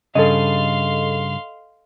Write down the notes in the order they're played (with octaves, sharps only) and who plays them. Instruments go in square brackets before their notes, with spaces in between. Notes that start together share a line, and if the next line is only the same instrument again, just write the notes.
[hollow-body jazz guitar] G2 C#3 [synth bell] A4 D#5 [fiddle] F5 C6